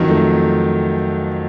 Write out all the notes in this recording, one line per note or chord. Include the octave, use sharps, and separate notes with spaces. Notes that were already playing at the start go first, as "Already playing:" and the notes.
Already playing: F2 D#3 F#3
A3